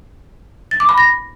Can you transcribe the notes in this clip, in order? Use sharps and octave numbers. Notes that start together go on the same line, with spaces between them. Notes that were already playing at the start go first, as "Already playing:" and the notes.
A6
D6
B5
A#6